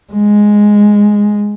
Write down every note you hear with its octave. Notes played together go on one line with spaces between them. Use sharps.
G#3